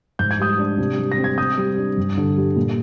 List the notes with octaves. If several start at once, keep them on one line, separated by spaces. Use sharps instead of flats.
G#2 G6
G#6
G3 D#6 G6
D4
C3
G3
A#6
C4
G#6
C3 D#6 G6
G3
D4
G2
D3
G3
A#2